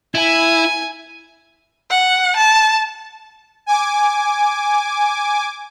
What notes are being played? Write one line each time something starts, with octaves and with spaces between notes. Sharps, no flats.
E4 G#5
F#5
A5
G#5 D6